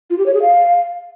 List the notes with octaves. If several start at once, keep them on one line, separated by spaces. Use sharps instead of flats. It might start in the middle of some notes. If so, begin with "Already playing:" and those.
F4
G4
C#5
G#4
F5